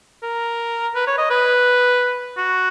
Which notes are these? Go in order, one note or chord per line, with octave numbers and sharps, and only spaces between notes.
A#4
B4
C#5
D#5
B4
F#4